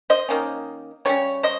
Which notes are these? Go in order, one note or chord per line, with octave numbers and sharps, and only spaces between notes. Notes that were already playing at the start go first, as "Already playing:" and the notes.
C5 D#5
D#3 A#3 C#4
C#3 G3 C#4 C#5
C5 D#5